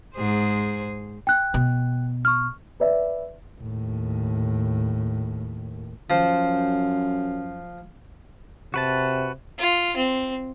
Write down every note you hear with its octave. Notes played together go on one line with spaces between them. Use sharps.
G#2 G#4 C5
G5 F#6
B2
C#6 F6
B4 D5 E5
D#2 A2
F#2 F3 C5
C3 F#4 B4 A5
F4
C4